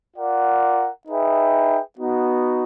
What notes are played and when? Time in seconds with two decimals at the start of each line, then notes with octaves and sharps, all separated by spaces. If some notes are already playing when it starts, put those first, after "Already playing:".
0.16 F4 A#4 D5 F#5
1.07 D#4 G#4 B4 E5 G5
1.98 B3 D#4 F#4